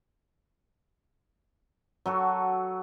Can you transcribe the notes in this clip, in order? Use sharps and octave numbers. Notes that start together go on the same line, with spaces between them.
F#3 F#4 A4